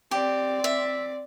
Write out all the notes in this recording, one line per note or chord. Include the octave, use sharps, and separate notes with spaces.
C4 G4 D5
E5